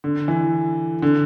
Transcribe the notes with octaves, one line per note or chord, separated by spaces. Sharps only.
D3
E3
D3